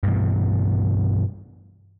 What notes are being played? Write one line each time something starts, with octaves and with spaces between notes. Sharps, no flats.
G2 B2 E3